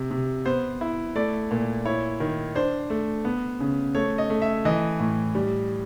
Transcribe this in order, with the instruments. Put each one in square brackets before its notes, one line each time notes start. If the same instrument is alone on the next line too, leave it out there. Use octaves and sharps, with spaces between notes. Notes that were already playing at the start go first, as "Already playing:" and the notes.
Already playing: [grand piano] C3
C3
B3 C5
E4
A3 D5
A#2
E4 C#5
D#3
D4 C5
A3
B3
C#3
A3 C#5
D#5
A3
E5
E3 D#5
A2
G3